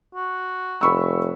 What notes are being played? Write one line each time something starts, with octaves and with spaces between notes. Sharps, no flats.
F#4
F1 B5 C#6 E6